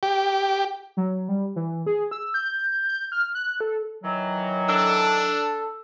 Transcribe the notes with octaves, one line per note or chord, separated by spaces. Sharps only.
G4
F#3
G3
E3
G#4
E6
G6
G6
F6
F#6
A4
D#3 E3 F#3
D4 A4 E6